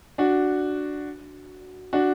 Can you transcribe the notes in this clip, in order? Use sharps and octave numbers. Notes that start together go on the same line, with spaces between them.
D4 F#4
D4 F#4